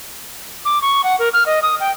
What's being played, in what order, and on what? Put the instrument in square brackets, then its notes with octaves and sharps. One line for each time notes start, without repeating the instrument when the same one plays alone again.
[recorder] D6
C#6
F#5
A#4
F6
D#5
D#6
G5